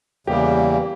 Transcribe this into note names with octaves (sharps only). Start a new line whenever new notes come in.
E2 C#3 E3 G3 A#3 G4